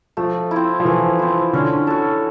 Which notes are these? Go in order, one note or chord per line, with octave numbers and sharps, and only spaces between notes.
F3 A3
C4 E4
F3
E3 A3
C4 E4
D3 C#4
F#4 A4